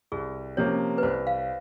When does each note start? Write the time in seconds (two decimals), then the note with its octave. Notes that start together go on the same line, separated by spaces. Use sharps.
0.12 C2 G#4
0.57 C3 F3 A#3 C#4 C#5
0.98 B4
1.03 C2 C5
1.27 F5